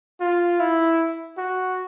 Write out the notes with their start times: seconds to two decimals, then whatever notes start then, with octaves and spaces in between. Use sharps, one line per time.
0.21 F4
0.60 E4
1.37 F#4